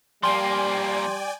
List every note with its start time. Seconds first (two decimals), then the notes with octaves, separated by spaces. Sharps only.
0.23 F3 G3 A#3 D5 G5 G#5 C6